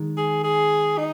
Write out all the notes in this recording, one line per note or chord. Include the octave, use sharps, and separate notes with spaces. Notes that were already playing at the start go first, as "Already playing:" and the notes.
Already playing: D#3 G#3
G#4
G#4
D#4